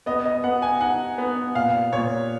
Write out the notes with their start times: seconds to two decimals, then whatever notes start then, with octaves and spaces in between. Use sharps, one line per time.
0.06 B3 D#5
0.26 D#5
0.44 B3 F#5
0.62 G#5
0.81 D#4 F#5
1.18 B3
1.55 A#2 F5
1.92 A#2 C#5